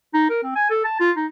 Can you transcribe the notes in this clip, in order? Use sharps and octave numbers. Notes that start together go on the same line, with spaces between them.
D#4
A#4
C4
G#5
A4
A5
F4
D#4